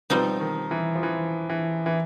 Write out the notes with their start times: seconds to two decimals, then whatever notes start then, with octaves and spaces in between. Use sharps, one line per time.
0.10 B2 F3 G3 C4 D#4
0.40 D#3
0.71 E3
0.95 F3
1.03 E3
1.50 E3
1.86 E3